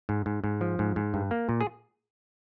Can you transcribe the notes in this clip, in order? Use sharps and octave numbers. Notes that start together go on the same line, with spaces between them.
G#2
G#2
G#2
F3
G#2
G#2
G2
A#3
A#2
G#4